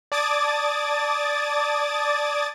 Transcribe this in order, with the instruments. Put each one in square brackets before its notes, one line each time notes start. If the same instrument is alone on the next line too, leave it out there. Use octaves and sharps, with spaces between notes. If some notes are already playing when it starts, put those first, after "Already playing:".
[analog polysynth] D5 A5 D6 D#6 G#6 A6